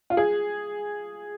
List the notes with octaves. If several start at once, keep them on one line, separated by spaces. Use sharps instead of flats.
F4
G#4